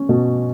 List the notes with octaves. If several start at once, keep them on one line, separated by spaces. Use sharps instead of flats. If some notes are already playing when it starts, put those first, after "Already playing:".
Already playing: C#4
B2